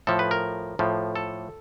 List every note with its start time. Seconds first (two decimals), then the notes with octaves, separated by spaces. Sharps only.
0.07 A2 F3 A4
0.19 B4
0.31 A#4
0.79 A2 F3
1.16 A4